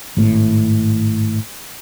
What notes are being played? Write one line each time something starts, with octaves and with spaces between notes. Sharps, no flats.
G#1 A2